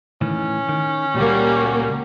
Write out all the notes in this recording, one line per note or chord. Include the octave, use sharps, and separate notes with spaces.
A2 D#3 E3 C#4
D#3
C#2 A#2 G3 A#3 F#4